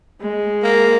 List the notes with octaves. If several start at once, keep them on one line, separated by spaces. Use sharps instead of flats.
G#3
A#3